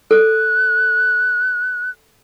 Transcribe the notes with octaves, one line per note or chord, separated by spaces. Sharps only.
A4 F#6